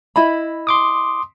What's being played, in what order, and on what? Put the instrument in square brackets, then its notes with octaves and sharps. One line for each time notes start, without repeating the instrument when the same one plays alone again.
[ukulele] E4 D#5 B5
[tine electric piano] C6 D6 D#6